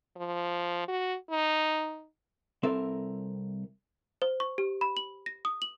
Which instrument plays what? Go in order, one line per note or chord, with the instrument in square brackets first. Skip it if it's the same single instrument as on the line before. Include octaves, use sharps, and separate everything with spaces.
[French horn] F3
F#4
D#4
[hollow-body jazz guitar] C2 C4 A4 A#4 E5
[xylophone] C5
C#6
G4
B5
F#7
A#6
D#6
F#7